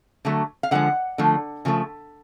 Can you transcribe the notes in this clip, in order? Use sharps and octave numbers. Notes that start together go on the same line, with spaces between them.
D3 F#3 A3
F5
D3 F3 G#3 F#5
D3 F3 A3
C#3 F3 A3